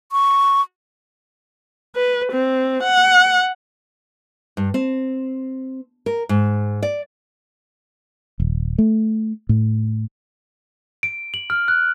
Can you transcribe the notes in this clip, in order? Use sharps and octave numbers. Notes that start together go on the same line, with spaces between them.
C#6
B4
C4
F#5
G2
C4
A#4
G#2
D5
D#1
A3
A2
D7
F#7
F6
F#6